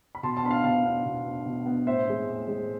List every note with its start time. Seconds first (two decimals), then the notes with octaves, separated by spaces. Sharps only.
0.15 B5
0.23 B2 A5 C6
0.37 A5 C6
0.43 B3 D4 B5
0.51 F5 A5
0.64 B2 F5 A5
0.84 B3 D4
1.05 B2
1.25 B3 D4
1.46 B2
1.66 B3 D4
1.86 A2 C5 E5
2.08 G#3 C4
2.28 A2
2.48 G#3 C4